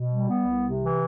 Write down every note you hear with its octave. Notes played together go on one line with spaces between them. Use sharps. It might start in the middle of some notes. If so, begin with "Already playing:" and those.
Already playing: B2
G3
B3
C2
C3
E3